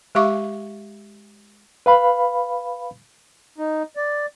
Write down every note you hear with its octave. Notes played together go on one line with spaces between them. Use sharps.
G#3 G4 E5 F5 C#6 D6
B4 F5 B5
D#4
D5